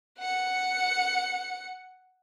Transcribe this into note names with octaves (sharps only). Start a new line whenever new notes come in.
F#5 C#7